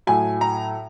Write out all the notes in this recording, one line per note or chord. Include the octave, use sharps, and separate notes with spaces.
A2 F#3 G#5
A#5